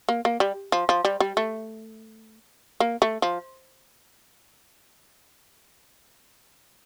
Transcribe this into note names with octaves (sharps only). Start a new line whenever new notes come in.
A#3
A#3
G3
F3
F3
G3
G3
A3
A#3
A3
F3